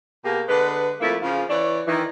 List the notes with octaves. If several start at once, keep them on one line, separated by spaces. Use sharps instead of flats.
B2 A#3 G4 G#4
D3 G#3 B4
F2 A3 A#3 E4
C#3 F3 F4 G#4
E3 C#5 D5
D#3 E3